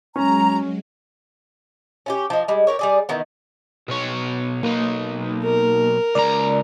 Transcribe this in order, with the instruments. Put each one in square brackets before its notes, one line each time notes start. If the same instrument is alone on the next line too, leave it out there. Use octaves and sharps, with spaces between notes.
[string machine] F#3 G#3 [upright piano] C#4 [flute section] A#5
[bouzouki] C#4 F4 G4
F3 D#5
G3 G#3
G4 A#4 C#5
G3 G#4 D5
D#3 E3 B3
[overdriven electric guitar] B2 C#5
[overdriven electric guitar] B1 D#4 [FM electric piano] A#3
[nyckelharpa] A#4
[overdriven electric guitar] C#2 A#5 [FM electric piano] D5